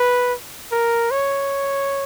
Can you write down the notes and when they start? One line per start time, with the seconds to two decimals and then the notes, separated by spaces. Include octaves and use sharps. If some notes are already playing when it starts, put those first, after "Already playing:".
Already playing: B4
0.72 A#4
1.11 C#5